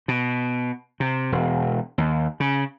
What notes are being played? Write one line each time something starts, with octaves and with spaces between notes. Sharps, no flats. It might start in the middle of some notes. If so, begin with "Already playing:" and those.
B2
C3
E1
D#2
C#3